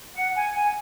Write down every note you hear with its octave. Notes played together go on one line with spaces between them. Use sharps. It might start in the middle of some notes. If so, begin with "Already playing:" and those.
F#5
G#5
G#5